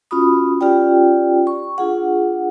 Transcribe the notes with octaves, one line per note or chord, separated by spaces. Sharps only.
C#4 F4 F#4 B5 D#6
C#4 F4 G4 D5 G5
C#6
D4 F4 G#4 F#5